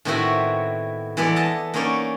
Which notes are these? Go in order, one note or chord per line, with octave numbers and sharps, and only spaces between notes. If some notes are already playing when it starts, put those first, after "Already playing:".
A2 D#3 B3 C4 E4 F#4
E3 G#3 B3 A4 D5
D#5 A5
A#3 B3 C#4 D#4 C#5 D5